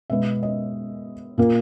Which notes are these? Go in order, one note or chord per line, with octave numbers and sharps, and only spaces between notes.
B2 G#3 B3 E5
D#5
A#2 A#3